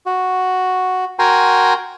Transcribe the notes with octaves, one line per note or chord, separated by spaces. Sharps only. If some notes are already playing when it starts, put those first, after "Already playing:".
F#4
F#4 A#4 G5 G#5 A#5 C6